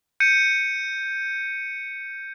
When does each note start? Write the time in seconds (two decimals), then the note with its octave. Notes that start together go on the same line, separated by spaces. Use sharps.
0.20 G6 C#7 D#7